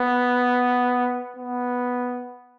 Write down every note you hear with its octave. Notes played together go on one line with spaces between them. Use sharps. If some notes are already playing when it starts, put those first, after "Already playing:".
Already playing: B3
B3